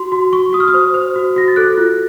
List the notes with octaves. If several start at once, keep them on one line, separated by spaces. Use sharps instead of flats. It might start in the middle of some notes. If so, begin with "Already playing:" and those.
Already playing: F#4 C6
F#4 C6
F#4 C#6
F#4 D#6
F6
D#6
C5
C5
F#4
F#4 A#6
A6
A4 F#6
F4